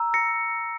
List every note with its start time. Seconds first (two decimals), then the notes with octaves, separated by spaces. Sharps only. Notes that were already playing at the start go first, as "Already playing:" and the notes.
Already playing: A#5 E6
0.14 A#6 C#7